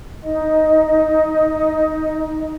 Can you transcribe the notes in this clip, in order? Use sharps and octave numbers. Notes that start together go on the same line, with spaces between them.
D#4 D#5